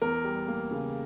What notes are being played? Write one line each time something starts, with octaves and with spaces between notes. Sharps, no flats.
E2 A#4
G3
A#3
C#3